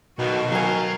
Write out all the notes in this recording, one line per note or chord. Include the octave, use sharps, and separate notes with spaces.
B1 B2 D#3 F#4
F#3 A#4 F5 G#5